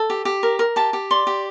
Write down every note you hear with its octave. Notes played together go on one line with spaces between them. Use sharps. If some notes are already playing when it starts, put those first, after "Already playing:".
Already playing: A4
G4
G4
A#4
A#4
G4 A5
G4
D5 C6
G4